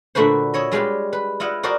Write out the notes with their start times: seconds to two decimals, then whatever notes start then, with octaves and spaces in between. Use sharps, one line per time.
0.15 A#2 D3 A3 F#4 B4 C5
0.54 E4 C#5 D#5
0.72 G3 G#3 F4 G4 B4
1.13 B4
1.40 E4 F4 D#5 F#5
1.63 F#4 G4 A#4 C5 D5 D#5